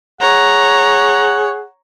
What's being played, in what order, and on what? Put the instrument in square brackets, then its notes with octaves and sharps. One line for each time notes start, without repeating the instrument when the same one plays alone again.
[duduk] G#4 [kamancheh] C#5 [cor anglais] F#5 [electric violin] A#5